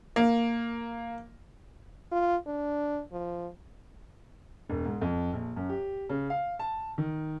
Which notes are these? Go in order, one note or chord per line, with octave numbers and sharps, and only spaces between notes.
A#3
F4
D4
F3
E1
G#2
F2
A#1
F#2
G4
C#3
F5
A5
D#3